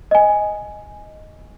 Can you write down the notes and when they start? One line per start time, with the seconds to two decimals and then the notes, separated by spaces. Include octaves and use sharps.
0.11 D#5 G#5